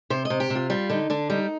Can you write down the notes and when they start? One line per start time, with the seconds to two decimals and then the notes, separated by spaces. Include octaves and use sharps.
0.10 C3 C5
0.25 D#5
0.30 C3
0.40 G4
0.50 C3
0.55 F4
0.70 G3 F4
0.90 D3 D#4
1.10 D3 D4
1.30 G3 D#4